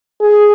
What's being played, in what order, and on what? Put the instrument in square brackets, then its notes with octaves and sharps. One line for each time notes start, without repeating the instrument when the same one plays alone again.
[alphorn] G#4